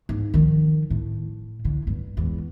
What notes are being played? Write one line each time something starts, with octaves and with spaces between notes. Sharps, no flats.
G#2
D#3 F3
A2
A2 D3
G2
G#1 E2